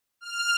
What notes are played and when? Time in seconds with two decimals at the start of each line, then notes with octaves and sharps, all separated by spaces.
0.21 F6